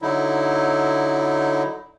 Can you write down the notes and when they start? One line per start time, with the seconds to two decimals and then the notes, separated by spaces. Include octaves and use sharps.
0.02 D3 F#3 D#4 E4